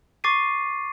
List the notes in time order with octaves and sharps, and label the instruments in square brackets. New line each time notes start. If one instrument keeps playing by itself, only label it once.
[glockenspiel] C#6 D6 A6 C7 D#7